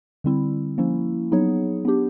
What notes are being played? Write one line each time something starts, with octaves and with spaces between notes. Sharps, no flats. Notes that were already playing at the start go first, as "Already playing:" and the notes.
D3 G3 C4 E4
F3 A#3 C#4 E4
F#3 B3 D#4 G#4 C#5
B3 D4 G4